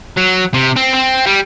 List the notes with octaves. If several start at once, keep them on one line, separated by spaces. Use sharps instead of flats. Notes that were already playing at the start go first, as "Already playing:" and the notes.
F#3
C3
C4
C4
G3